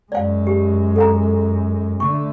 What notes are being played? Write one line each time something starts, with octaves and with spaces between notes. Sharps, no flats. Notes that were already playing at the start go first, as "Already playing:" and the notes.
F#2 G#3 D5 F5
G4
A4 F5 A#5
D3 A3 C#6